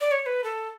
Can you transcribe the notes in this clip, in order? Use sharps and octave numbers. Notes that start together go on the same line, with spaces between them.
D5
C#5
C#5
B4
A4